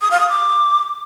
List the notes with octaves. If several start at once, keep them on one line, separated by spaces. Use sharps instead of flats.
D#6
F5
D#6
D6